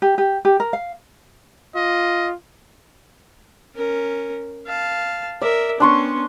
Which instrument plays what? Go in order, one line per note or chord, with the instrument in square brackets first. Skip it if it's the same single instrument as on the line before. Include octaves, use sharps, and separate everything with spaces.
[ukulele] G4
G4
G4
A#4
F5
[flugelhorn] F4 [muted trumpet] D#5
[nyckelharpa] C#4 A#4
F5 A5
[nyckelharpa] A#4 E5 [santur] D5
[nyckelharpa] B3 C#4 [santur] D4 C6 C#6